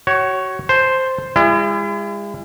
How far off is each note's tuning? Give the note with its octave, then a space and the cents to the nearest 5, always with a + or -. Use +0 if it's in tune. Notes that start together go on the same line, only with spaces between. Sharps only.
F#4 +35 C#5 +0
C5 +0 A5 +0
G#3 -40 E4 +40